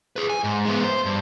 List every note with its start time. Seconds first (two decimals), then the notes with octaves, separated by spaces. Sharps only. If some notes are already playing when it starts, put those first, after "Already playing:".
0.16 G#4 B4
0.30 G#5
0.44 G#2
0.65 G#3 B3
0.84 C5
1.05 G2